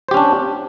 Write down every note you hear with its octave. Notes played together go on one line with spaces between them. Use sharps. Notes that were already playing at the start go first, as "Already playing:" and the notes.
C#4 D4 G4 C5